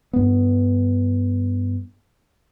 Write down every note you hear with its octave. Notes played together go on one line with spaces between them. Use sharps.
G2 B3